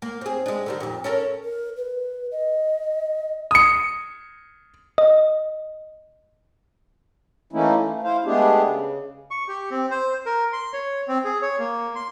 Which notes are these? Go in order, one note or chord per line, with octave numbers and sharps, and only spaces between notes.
A#3
C4 G#4
G#3 D4
D3 D#3 G3
F2 A#2
C#4 A4 A#4
A#4
B4
D#5
D#6 C#7
D#5
E3 A3 A#3 C#4 D#4 E4
A3
E4 C5 F5
G#3 A3 B3 D4 G4 G#4
C#3
C#6
G4
C4
C5
A#4
C6
C#5
C4
G#4
C#5
A#3
C6